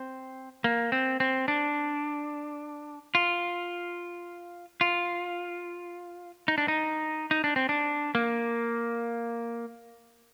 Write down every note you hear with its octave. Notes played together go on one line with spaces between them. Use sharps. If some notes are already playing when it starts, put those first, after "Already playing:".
Already playing: C4
A#3
C4
C4
D4
F4
F4
D#4
D4
D#4
D#4
D4
C4
D4
A#3